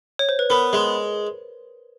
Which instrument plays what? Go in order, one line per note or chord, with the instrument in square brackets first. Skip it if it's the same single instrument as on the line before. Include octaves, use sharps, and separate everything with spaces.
[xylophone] C#5
C5
B4
[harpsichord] B3 [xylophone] A#4
[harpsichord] G#3